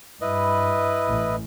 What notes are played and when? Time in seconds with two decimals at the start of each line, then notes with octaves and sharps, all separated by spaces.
0.21 G2 E4 B4 D#5
1.08 A1